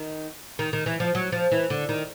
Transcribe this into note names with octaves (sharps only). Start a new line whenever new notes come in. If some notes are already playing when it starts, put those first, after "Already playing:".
Already playing: D#3
D#3
D#3
E3
F3
F#3
F3
E3
D3
D#3